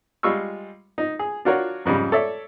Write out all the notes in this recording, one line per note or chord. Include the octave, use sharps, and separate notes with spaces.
G3 G#3 F4 C#6 E6
D#4
G#4
D4 F4 F#4 A#4 C#5
F2 G#2 C#3 G3
A4 C#5 D5 E5